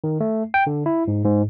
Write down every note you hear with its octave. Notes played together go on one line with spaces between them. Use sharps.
D#3
A3
G5
D3
E4
G#2
G#2